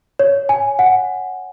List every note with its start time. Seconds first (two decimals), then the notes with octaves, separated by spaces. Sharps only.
0.19 C#5
0.49 G#5
0.79 F#5